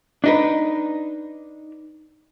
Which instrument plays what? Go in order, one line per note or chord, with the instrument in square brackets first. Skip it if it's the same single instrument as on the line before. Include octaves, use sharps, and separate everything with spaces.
[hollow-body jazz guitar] D4 D#4 B4